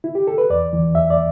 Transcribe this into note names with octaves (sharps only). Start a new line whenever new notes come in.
E4
G4
A4
B4
E2 D5
E3
E2 E5
D5